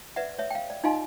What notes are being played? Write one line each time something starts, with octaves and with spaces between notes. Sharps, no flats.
B4 D5 E5 F#5
C#5 E5
F5 G5
D5
D#4 F4 D#5 F5 G#5 C6